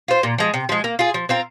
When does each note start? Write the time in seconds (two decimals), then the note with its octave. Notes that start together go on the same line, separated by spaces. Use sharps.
0.08 F4 C5
0.23 A#2
0.38 F3 G#3
0.54 C3
0.69 F3 G#3
0.84 A#3
0.99 F4 G#4
1.14 F3
1.29 C4 F4 A#4